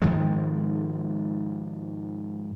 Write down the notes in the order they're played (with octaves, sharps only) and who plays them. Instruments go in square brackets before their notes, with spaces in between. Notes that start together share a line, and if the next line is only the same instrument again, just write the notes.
[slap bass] G#2 D#3 F3 G#3